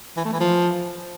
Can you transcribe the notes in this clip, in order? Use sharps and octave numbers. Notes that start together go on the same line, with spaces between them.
E3
A3
E3
F3